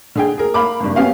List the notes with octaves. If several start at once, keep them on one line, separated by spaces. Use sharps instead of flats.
D3 G#4 G5
G#4 A#4
A#4 F5 B5 D6
F#1 G2
B3 C#4 G4 F5